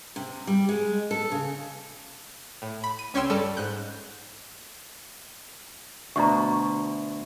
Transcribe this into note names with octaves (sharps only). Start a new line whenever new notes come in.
C3
G3
G#3
A4
C#3
A2
B5
D#7
C#2 C#4 C#5 G5 C6 E6
G2 G3 A4 C#7
G#2 F#6 G6
D2 B2 A#5 C#6